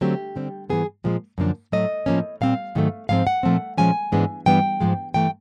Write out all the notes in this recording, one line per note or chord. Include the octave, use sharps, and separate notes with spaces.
D3 F#3 A3 C4 G4
D3 G3 C4
G#2 E3 G3 B3 G#4
A#2 F3 G#3
F#2 D3 F3 A#3 D4
A2 F#3 A3 D#5
A2 F3 A#3 C#4
A#2 G3 C4 F5
G#2 D#3 F#3 A3
G#2 F3 G#3 C4 F5
F#5
A#2 F3 A3 C4
A#2 F3 G#3 C#4 G#5
G#2 E3 G#3 B3 D4
G2 E3 G3 B3 D4 G5
G#2 F3 G#3
G2 E3 A3 G5